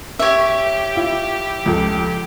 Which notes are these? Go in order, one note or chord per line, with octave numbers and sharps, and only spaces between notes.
G4 C#5 E5
E4 F4
C#2 F3 A4